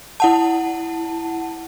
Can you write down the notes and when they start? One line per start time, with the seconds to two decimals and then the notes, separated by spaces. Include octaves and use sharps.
0.20 E4 F#5 A5